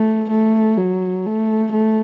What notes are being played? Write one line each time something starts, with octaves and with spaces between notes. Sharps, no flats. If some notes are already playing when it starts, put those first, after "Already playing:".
Already playing: A3
A3
F#3
A3
A3